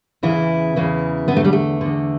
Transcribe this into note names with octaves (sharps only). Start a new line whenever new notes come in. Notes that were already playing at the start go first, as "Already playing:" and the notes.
E2 C#3 E3 E4
E2 C#3 E3
E2 D3 B3
A3
G3
A3
E2 D3